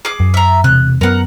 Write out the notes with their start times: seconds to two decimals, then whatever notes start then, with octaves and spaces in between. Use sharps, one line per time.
0.05 G#4 D6
0.20 F#2
0.34 E5 A#5
0.64 E1 C3 F#6
1.01 F#2 B3 A#4 F#5